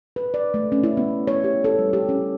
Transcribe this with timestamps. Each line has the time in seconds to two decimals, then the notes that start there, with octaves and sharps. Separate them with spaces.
0.16 B4
0.34 D5
0.54 A3
0.72 C#4
0.84 E4
0.97 B3
1.27 C#5
1.44 G4
1.64 A4
1.79 G3
1.93 G4
2.09 C#4